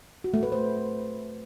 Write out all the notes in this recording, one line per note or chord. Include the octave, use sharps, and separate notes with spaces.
F#4
A3
B4
C5